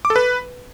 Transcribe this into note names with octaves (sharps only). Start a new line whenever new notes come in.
D6
A4
B4